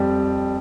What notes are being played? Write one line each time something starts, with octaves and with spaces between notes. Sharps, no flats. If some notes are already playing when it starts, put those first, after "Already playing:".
Already playing: F2 G3